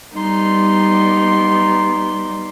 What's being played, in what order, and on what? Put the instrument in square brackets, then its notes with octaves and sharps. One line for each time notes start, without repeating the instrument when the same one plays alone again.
[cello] G3 B3 [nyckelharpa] D#4 C6